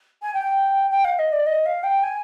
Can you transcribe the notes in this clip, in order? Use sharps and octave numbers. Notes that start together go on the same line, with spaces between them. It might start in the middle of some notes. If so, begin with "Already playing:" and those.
G#5
G5
G5
F5
D#5
D5
D#5
F5
G5
G#5